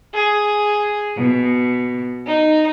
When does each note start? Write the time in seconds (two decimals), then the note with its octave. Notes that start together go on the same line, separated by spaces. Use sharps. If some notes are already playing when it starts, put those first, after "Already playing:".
0.14 G#4
1.18 B2
2.26 D#4